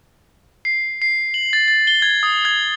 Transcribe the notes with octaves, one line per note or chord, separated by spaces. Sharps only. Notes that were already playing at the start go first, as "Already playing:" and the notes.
C7
C7
F#7
A6
A6
G7
G#6
D#6
G#6